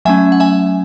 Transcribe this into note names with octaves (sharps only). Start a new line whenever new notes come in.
F#3 A3 C#4 E5 G#5
F#5
E5 G#5